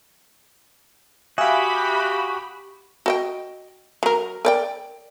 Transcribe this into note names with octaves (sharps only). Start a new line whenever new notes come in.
F#4 G4 E5 F5 G#5 B5 D#6
F#4 D#5 G5
F#3 A#4
A#4 D5 G5